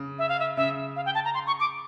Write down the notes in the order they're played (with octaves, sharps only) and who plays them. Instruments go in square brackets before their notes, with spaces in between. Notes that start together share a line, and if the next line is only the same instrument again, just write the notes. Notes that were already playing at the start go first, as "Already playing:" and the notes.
Already playing: [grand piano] C#3
[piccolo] E5
F5
E5
[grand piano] C#3 [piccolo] E5
[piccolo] F5
G5
A5
A#5
C6
C#6
D6